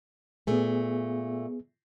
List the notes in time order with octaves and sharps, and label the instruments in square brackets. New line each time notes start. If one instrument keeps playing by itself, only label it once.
[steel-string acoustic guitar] A#2 A3 [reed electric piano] B3 G#4